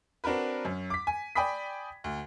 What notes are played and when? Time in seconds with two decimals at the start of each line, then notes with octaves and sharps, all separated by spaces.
0.24 C4 D4 F#4 A#4 B4
0.65 F#2 C#4
0.90 D6 B6
1.07 G#5
1.35 D5 G5 G#5 B5 D#6 B6
2.04 D2